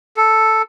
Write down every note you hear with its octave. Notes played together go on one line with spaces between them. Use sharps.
A4